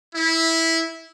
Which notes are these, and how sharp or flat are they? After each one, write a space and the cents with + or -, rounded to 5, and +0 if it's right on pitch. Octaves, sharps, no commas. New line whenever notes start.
E4 -10